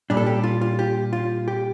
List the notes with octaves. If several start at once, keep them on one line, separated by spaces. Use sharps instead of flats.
A#2 G3 D4
A4
G4
F4
F4
G4
F4
G4